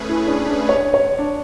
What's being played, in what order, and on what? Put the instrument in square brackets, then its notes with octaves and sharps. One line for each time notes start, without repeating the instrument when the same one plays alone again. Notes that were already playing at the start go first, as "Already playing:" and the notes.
Already playing: [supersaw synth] A3 C#4 G#4 B4
[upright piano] E4
D4
D4
C#5
C#5
D4